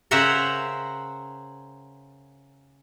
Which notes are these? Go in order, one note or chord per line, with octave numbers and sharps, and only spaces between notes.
C#3 A#4 C5 E5 F#5 A#5